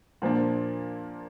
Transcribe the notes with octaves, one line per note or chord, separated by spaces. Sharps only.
A#2 F3 A#3 D4